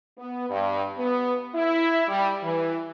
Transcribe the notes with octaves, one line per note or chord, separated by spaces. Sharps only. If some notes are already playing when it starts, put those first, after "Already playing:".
B3
G2
B3
E4
G3
E3